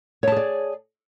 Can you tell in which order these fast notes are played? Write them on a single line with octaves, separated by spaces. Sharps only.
C#5 A5 G#4 D5